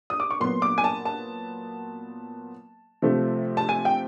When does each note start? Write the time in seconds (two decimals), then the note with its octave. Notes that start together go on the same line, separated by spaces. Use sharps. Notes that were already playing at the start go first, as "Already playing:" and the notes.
0.10 D#6
0.20 D6
0.31 C#6
0.40 A#2 F#3 B3 C6
0.62 D6
0.78 G#5
0.84 A5
1.05 A5
3.02 C3 F3 A3
3.57 A5
3.69 G#5
3.85 G5